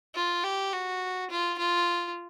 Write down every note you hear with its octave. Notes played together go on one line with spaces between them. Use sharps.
F4
G4
F#4
F4
F4